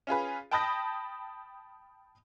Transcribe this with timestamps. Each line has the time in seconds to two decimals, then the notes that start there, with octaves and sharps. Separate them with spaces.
0.07 C#4 F4 G#4 B4
0.51 G5 A5 B5 D#6 G6 A#6